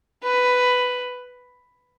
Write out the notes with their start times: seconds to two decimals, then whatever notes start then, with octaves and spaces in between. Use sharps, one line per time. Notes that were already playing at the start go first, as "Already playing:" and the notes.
0.23 B4